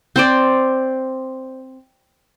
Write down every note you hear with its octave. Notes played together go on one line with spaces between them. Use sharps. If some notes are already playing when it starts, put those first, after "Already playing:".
C4 C5 D5